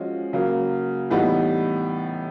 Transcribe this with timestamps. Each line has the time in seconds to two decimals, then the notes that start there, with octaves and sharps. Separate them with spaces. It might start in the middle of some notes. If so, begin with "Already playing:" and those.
Already playing: F3 G#3 C#4 F#4
0.33 C#3 F#3 A#3
1.10 A2 E3 G3 B3 D#4